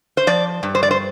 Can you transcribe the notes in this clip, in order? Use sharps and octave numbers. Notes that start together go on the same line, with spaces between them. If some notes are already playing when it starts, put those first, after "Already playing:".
C5
F3 D5
G2
C5
D5
C5